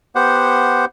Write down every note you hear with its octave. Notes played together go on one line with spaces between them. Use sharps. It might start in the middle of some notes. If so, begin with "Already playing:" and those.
B3 G4 C5 F#5